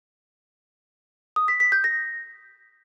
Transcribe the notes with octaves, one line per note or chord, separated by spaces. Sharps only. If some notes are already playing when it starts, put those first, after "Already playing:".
D#6
B6
B6
G6
A#6